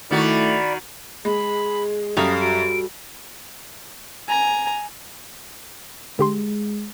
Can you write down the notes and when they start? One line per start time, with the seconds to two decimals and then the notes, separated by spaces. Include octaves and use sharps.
0.11 D#3 A3 E4 F#4 D5 B5
1.25 G#3 G#4 B5
2.17 F#2 G3 A4 F5 D#6
2.41 F#4 D7
4.28 G#5 A#5
6.19 D3 G#3 G4 C6